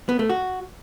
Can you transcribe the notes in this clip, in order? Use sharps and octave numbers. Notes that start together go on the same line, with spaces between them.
B3
A3
F#4